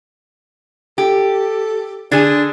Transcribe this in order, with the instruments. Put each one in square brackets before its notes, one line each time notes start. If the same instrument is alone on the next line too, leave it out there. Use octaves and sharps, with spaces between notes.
[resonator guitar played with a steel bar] G4 [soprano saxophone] A4
[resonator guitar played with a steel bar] D3 G#4 [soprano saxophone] D4